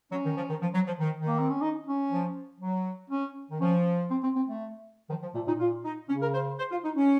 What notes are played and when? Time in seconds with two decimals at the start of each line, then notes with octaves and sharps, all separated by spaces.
0.12 F#3 C#4
0.25 D#3
0.37 F3
0.50 D#3
0.62 F3
0.74 F#3
0.87 F3
0.99 D#3
1.21 D#3
1.27 A#3
1.39 C4
1.50 C#4
1.62 D#4
1.86 C#4
2.11 F3
2.61 F#3
3.10 C#4
3.51 D#3
3.60 F3 C#4
4.11 C4
4.23 C4
4.36 C4
4.47 A3
5.10 D#3 F3
5.22 F3
5.34 A#2 A3
5.47 A#2 D#4
5.60 A#2 F4
5.85 D#4
6.09 C#3 C#4
6.22 A#4
6.34 C5
6.59 C5
6.71 F4
6.84 D#4
6.97 C#4